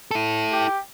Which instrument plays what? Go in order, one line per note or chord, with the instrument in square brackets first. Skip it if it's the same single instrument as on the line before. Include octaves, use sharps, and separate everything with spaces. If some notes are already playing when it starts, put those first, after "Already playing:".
[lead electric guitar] E4 A4
[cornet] G4